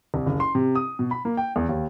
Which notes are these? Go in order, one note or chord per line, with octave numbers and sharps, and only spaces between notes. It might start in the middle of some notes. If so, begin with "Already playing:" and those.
C2
F#1
C6
C3
D#6
B2
B5
A#3
G5
E2
D#2